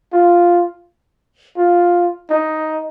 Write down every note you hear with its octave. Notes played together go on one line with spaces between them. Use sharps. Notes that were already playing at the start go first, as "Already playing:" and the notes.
F4
F4
D#4